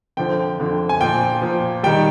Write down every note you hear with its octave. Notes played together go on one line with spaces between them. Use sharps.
F2 D3 F3 G5
F2 D3 F3
G#5
A#2 F3 G5
A#2 F3
D#3 G3 G5